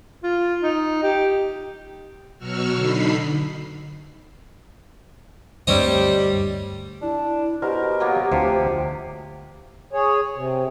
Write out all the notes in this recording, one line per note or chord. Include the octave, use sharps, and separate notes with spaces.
F4
D#4
G4
B2 F#3 F#4 C#6 E6 F6
D3 D#4 B5 C7
D2 G2 G3 C4 C#5 D#5
D4 E4
B2 G4 A#4 C5
F#3 A#3 B3
D2 C3 F3
G#4 C#5
C3